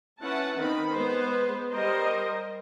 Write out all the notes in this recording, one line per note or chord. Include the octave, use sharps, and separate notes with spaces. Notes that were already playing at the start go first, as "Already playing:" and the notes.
C#4 E4 B4 F#5 A5
D#3 C4 B5
G#3 B3 B4 C5
G3 A#4 C5 D#5